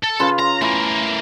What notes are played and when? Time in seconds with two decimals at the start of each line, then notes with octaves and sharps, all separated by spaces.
0.04 A4
0.19 C#3 F4 B4
0.39 A#5 C6
0.62 E3 A3 A#4